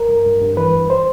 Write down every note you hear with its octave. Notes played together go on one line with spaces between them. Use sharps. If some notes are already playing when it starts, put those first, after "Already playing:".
Already playing: A#4
G2
G2
G2
E3 B4
G2
C5